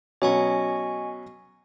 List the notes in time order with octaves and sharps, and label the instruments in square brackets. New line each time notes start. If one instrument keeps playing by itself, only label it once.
[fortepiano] B2 F#3 C#4 [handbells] D#5 G#5 C#6